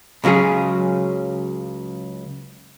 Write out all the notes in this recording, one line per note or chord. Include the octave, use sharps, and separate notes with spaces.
C#2 C#3 F#3 C#4 G#4